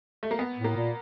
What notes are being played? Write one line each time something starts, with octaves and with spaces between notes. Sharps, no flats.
A3
A#3
B3
A2
A#3
A#2